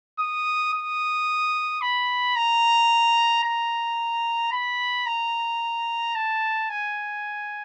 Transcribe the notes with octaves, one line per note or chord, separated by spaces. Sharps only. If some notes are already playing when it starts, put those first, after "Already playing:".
D#6
D#6
B5
A#5
A#5
B5
A#5
A5
G#5